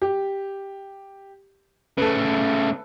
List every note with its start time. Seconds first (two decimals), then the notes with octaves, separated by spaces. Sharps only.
0.02 G4
1.97 C#3 A3 A4 B4